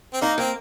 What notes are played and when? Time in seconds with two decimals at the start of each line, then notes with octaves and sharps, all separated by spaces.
0.13 C4
0.21 A#3 D#4
0.38 A#3 C4